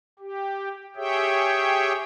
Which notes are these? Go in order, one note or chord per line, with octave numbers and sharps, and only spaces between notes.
G4
G4 G#4 C#5 E5 G5